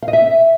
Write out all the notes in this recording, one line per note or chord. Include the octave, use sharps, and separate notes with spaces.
F5
D#5
E5